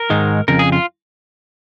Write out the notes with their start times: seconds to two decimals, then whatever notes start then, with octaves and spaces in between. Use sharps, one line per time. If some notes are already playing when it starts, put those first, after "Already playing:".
Already playing: A#4
0.10 G#2 D#3 G#3
0.48 F2 C#3 A#4
0.59 G#4
0.72 F4